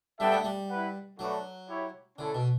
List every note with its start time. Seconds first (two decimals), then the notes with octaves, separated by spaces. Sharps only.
0.20 G3 B3 D4 A4 E5 G5
0.32 A3
0.44 G3
0.70 E4 B4 F#5
1.19 F#3 A3 D4 F#4 B4 D5
1.69 E4 G4 C#5
2.18 D3 C#4 E4 A4
2.35 B2